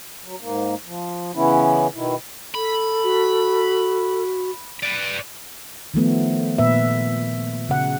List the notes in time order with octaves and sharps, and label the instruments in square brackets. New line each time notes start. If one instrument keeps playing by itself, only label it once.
[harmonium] F#3
G#2 A#3
F3
C#3 E3 B3 C#4 E4
B2 D#3 E4
[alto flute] A4 [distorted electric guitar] B5
[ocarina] F#4
[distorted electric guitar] B4 D5
[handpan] D#3 F3 A3 B3
A#2 B3 B4 E5
C#3 F#5